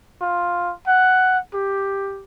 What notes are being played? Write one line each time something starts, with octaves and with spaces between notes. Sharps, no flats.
F4
F#5
G4